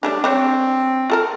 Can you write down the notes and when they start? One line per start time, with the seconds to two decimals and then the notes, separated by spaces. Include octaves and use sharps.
0.03 G3 A3 C#4 D4
0.24 C4 D4 C5 C#5
1.10 F4 A4 A#4